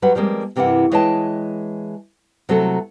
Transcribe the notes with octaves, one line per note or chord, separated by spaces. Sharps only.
F#3 G3 B4 F#5
F3 G3 G#3 A#3 C4
G2 C3 E3 A#3 E4 F#5
E3 G#3 C#5 D#5 G5 A5
C3 F#3 A3 A4